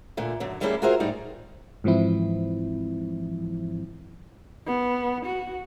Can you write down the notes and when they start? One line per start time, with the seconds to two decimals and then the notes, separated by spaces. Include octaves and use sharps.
0.17 A#2 D3 A3
0.40 F#2 D3 F#3
0.61 G3 A3 A#3 C#4 E4 G#4
0.82 F4 F#4 G#4 A#4 C5 E5
1.00 A2 G3 D#4 D5
1.84 G#2 E3 F3 C4 E4
4.67 B3
5.25 F#4